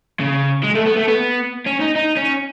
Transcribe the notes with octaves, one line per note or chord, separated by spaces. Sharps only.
C#3
G#3
A3
B3
A3
B3
C#4
D#4
D#4
C#4